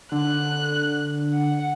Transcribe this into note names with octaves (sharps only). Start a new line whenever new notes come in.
D3 F#6
F#5